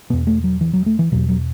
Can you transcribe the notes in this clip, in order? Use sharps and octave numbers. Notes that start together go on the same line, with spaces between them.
E2 B2 B3
A3
F#3
E3
F#3
A3
E3
E2 B2 F#3
F#3